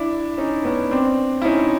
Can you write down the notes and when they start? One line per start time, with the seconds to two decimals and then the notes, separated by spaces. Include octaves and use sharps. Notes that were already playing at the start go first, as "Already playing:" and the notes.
Already playing: D4 E4
0.38 C#4 D#4
0.65 B3 C#4
0.91 C4 D4
1.42 E4
1.45 C#4 D#4